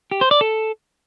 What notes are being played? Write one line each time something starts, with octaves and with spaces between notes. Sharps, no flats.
G4
C5
D5
A4